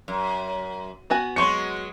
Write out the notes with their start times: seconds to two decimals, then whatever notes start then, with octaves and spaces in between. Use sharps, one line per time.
0.08 F#2
1.10 B3 F#4 G#5
1.36 F#3 G#3 C6 C#6 C#7